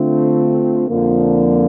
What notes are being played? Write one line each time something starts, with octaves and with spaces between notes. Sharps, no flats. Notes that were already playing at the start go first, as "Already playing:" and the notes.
Already playing: D3 A3 C4 F4
F2 D3 F3 A#3